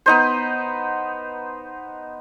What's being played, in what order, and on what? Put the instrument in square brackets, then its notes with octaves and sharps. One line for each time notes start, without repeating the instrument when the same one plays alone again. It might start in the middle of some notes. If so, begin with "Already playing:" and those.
[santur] B3 D#4 C5